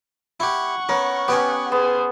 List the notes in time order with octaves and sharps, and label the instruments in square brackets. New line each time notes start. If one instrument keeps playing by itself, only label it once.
[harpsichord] E4 G4 [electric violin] F#5 C#6
[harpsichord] B3 C#4 [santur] A#4
[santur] B3 C#4 [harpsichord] G4 G5 G#5
[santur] B3 [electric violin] G#4 C5